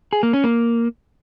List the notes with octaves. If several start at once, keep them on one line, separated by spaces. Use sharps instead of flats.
G#4
A#3
C#4
A#3